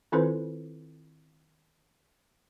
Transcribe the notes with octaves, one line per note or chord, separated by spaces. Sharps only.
D#3 C4 E4 F4 B4 C5